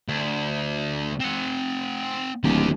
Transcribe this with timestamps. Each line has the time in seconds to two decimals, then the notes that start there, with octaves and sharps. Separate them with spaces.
0.09 D2
1.20 C4 F#5
2.44 D1 D#2 G4